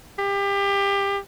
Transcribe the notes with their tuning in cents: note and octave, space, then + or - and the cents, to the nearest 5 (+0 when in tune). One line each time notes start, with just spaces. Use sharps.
G4 +25